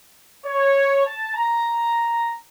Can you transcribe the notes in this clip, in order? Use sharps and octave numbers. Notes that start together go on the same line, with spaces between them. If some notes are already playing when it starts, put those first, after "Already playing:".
C#5
A5
A#5